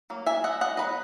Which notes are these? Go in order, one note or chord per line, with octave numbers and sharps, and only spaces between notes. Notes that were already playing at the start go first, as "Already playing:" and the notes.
F#3 A#3
E5 G#5
D#5 F#5
D#5 F#5
F#3 B3 D#4 B4 D#5